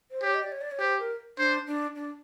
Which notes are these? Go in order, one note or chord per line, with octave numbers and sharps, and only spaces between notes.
C5
G4 C#5
D#5
D5
C#5
D5
C#5
G4 C5
A#4
D4 C5
D4
D4